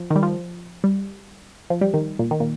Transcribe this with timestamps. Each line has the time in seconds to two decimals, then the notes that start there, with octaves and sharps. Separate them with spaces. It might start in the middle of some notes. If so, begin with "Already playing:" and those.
Already playing: F3
0.10 D#3
0.16 G3
0.23 F3
0.84 G3
1.70 F3
1.81 G3
1.94 D#3
2.19 A#2
2.31 D#3
2.40 A#2